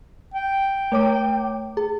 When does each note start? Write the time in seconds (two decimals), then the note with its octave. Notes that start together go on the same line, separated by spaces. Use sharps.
0.34 G5
0.92 A3 C#5 D6
1.77 G#4